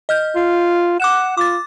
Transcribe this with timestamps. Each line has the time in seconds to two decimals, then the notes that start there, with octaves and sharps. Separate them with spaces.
0.09 D#5 F6 G6
0.36 F4
1.00 F#5 D6 F#6 E7
1.37 F4 D6 A6